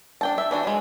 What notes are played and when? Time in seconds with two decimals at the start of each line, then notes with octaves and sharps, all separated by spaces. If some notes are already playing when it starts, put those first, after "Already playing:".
0.21 D4 G5 A5
0.38 E5
0.51 E3 D4 F#4
0.63 F#3 G#3